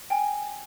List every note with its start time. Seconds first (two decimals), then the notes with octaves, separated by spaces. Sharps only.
0.10 G5 G#5